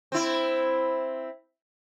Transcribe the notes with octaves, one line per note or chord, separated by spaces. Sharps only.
C4 E4